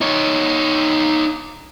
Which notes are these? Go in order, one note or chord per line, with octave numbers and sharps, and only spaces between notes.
D#4 C#5